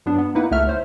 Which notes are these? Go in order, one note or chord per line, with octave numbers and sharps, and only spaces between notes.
G2 F#3 B3 D4
B3
A#3 D#4 E4 B4 F#5
C#2 A3 E5 F6
C5 C#5